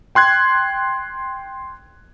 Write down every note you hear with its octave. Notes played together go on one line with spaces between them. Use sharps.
G5 C6 F#6 G#6